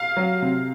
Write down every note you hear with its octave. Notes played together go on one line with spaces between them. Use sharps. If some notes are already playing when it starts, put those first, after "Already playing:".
Already playing: F5
F#3
C3